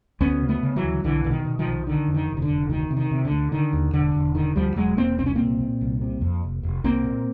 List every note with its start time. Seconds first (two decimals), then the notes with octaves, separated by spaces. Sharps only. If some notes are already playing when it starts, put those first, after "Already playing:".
0.20 D2 B3 C#4
0.42 C#3
0.49 A3 B3
0.63 C#3
0.76 E3 F#3
0.83 D2
1.04 B1 D3 E3
1.24 B2 D3
1.31 D#3
1.45 B2
1.59 D#3 F3
1.67 B1
1.87 D3 D#3
2.07 F2
2.14 D#3
2.29 F1
2.37 D#3
2.42 D3
2.49 F1
2.70 D2 D#3
2.91 C3
2.97 D#3
3.11 C3
3.25 D3
3.31 D2
3.52 D3 D#3
3.73 D#2
3.93 E1 D3
4.15 E1
4.35 D3 D#3
4.56 D2 F3 G3
4.76 E1 F#3 G#3
4.97 E1 A#3 C4
5.18 C2 C4
5.26 C#4
5.35 A#2 A#3 C4
5.60 A#2
5.81 C2
6.01 C3
6.21 F2
6.43 F1
6.63 F1
6.84 C2 A#3 C4
7.04 A#2